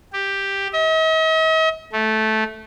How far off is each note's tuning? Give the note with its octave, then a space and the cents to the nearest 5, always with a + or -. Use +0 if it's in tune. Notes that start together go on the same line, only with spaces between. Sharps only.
G4 +5
D#5 +45
A3 -10